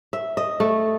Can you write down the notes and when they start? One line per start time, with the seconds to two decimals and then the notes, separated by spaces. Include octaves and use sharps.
0.13 E5
0.37 D#5
0.60 A3